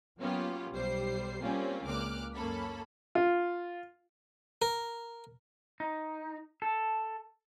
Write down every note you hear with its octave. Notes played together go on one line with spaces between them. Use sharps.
F#3 A#3 B3 C#4 F4 G4
B1 G3 C5 C7
G3 A#3 C4 C#4 F4
C#2 A#2 D6 F6 F#6
F#2 A#3 C#4 A4 B5
F4
A#4
D#4
A4